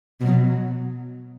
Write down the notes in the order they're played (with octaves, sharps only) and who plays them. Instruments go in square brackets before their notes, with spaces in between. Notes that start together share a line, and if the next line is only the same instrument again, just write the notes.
[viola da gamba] B2 [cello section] F#3